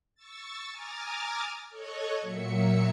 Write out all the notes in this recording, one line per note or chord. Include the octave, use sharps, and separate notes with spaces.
C#6 E6 A6
G#5 A#5 D6 D#6 F6 A6
A4 C#5 D#5 C#6 F#6 G#6
A#2 F#3 E5 C#7